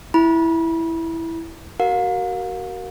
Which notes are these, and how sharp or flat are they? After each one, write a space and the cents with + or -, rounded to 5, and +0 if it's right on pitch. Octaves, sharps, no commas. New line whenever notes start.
E4 +0 B5 -30
F#4 +35 A#4 +0 F5 +35